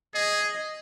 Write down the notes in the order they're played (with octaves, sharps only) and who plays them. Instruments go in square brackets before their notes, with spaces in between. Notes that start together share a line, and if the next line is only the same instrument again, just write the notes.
[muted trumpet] G#4 [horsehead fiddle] D#5